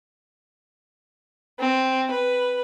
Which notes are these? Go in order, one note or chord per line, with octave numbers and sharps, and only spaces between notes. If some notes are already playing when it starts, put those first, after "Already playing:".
C4
B4